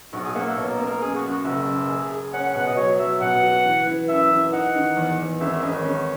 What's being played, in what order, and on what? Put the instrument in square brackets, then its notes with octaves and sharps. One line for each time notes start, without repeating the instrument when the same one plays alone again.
[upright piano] B1 [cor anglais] F#4
[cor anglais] G#4
[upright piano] A#3 [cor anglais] F#5
[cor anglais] E5
[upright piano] B2 [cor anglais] C#5
[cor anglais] A#4
[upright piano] A#3 [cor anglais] A#4
[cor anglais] A#4
[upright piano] F#2 [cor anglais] G#4
[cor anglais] F#4
[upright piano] F#2
[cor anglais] F#4
[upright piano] F#1 [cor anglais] E5
[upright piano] F#2
G#4
G#4
[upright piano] C#4 [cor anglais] F#5
[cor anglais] F#5
[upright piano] B2 [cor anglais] F#5
[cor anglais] D#5
[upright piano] F#3 [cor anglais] C#5
[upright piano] F#3 [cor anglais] E5
[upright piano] B2 [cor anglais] F#5
[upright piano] F#4
E3
E3
[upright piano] F#2 [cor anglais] E5
[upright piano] E3
[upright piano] D#4 [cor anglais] F#5
[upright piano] D#3
E2
E2
[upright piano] G#1 [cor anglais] E5
[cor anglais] E5
[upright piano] G#1 [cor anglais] D#5
[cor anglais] C#5
[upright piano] G#1